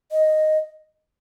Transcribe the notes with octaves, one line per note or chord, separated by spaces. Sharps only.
D#5